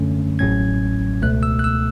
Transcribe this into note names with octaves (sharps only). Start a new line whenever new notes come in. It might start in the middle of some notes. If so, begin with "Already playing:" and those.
Already playing: F#2 D3 A3 C#4
A1 A2 F#3 C#4 G#6
C#2 B2 A3 F#6
E6
F#6
E6